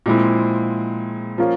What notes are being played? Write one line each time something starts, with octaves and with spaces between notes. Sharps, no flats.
A#2 F3 G#3 C4 E4
F3 A#3 C#4 F4